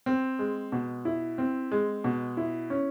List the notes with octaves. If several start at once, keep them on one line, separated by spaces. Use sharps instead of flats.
C4
G#3
B2
E4
C4
G#3
B2
E4
C#4